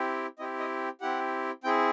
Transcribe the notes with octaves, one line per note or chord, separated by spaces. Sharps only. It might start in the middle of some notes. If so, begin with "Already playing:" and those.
Already playing: C4 E4 G4
C4 E4 G4 D#5
D#5
C4 E4 G4 F#5
C4 E4 G#4 G5